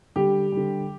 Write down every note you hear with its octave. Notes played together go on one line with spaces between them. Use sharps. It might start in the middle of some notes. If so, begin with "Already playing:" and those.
D3 G3 G4
D3 G3